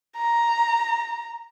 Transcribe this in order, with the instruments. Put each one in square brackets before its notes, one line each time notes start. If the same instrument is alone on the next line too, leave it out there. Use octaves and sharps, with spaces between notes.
[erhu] A#5